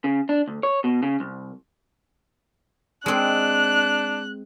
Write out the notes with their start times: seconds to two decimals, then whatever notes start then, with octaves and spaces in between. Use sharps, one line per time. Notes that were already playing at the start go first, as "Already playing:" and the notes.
0.04 C#3
0.29 D4
0.48 D2
0.63 C#5
0.84 B2
1.03 C#3
1.20 C2
3.06 G#3 C4 D4 F#6